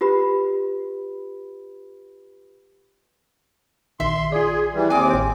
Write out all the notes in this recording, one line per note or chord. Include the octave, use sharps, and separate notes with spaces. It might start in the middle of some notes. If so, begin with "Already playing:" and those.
F4 G4 B4 B5
A#1 D#3 E5 C6
F4 G#4 D5
E3 G3
D#2 C4 G#4 G#5 D6
A1 G5